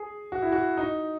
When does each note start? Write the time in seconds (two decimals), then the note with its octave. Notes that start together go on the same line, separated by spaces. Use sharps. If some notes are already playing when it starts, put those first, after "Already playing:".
Already playing: G#4
0.32 F#4
0.42 E4
0.52 F#4
0.77 D#4